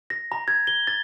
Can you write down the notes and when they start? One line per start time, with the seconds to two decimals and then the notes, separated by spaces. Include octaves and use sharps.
0.10 A#6
0.32 A#5
0.48 G#6
0.67 G7
0.87 A6